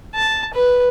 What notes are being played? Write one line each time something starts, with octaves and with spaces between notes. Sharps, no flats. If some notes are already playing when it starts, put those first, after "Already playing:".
A5
B4